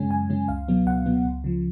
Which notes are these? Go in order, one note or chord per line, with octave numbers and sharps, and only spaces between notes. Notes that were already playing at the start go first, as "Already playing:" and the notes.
Already playing: F#2 C#3 G#3 C#4 G#5
F#2 G#5
C#3 G#3 C#4
C#2 F5
B2 F#3 B3
C#2 F#5
B2 F#3 B3
C#2
C#3 F3